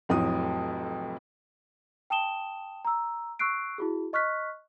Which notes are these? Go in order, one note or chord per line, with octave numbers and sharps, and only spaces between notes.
F1 F2 A2 F#3 D#6
G5 A5 D#6 E7 G7
A#5 E6
C#6 E6 F#6 C7 D7
E4 F#4 G#4
D#5 C#6 F6 F#6 B6